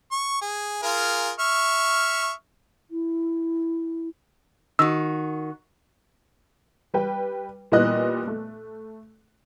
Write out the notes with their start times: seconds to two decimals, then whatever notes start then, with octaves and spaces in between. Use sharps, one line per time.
0.12 C#6
0.41 G#4
0.83 F4 G#4 A#4
1.40 E5 C#6 F6
2.90 E4
4.79 D#3 F#4 E6
6.94 G3 B4 G5
7.72 A#2 E3 G3 B3 D#5 F#6
8.27 A3